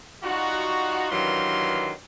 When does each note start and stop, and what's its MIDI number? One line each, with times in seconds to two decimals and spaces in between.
0.24 1.07 55
0.24 1.07 63
0.24 1.07 65
0.24 1.07 66
1.10 1.91 43
1.10 1.91 51
1.10 1.91 52
1.10 1.91 54
1.10 1.91 77
1.10 1.91 84